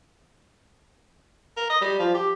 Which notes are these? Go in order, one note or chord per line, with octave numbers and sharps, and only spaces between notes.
A#4
D#5
G3
F3
G4